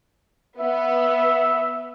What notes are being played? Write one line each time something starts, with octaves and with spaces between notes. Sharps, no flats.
B3 E5